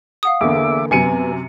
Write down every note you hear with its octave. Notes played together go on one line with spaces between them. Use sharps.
F5 F#5 D#6
E2 D3 A#3 E5 D6
F#2 C3 B3 G#5 C#7 D#7